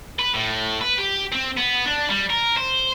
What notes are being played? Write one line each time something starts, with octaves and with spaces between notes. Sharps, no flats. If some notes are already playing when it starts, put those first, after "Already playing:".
B4
A2
B4
G4
C4
B3
D4
G3
A#4
C5